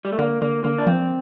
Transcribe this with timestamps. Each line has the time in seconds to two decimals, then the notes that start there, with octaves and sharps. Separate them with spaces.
0.05 G3
0.12 A3
0.19 D3 A#3
0.42 D3 A#3
0.64 D3 A#3
0.78 D4
0.87 F3 C4